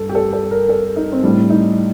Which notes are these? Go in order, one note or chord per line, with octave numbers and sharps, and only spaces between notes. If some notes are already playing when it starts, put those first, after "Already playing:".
Already playing: G2 A4
G4
A4
A4
A#4
A4
D#4
C4
A2 G3 D4
D#4